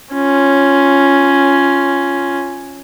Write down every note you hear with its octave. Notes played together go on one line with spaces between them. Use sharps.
C#4 F4